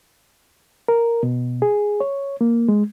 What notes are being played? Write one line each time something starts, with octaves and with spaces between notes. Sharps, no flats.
A#4
B2
G#4
C#5
A#3
G#3